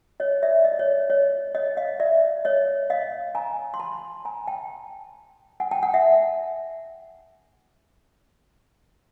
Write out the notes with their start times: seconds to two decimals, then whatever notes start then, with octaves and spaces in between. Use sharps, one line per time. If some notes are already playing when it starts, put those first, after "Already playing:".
0.20 C#5 D#5
0.43 D5 E5
0.65 D#5
0.72 D5
0.79 C#5 D#5
1.10 C#5 D#5
1.55 C#5 D#5
1.77 D#5 F5
2.00 D5 E5
2.45 C#5 D#5
2.90 D#5 F5
3.35 G#5 A#5
3.74 C6
3.80 A5 B5
4.25 G#5 A#5
4.47 G5 A5
5.60 F#5 G#5
5.71 G5 A5
5.83 F#5 G#5
5.94 E5 F#5